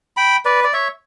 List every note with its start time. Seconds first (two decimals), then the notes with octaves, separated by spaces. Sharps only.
0.17 G5 B5
0.45 B4 D5
0.64 D5
0.73 C#5 E5